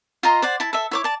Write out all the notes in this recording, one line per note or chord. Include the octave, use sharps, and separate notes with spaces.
F4 D#5 A#5 C6
C5 D5 F#5
E4 A5
A4 E5
E4 C#5 D6
D5 A5